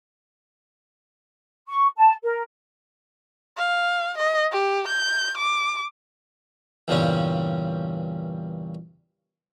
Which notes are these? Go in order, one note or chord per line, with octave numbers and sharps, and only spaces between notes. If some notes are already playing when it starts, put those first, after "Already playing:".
C#6
A5
A#4
F5
D#5
G4
G6
D6
E2 G2 A#2 C#3 G3 C#4